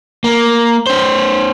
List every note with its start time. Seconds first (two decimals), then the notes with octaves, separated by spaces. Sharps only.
0.24 A#3
0.87 C#4 C5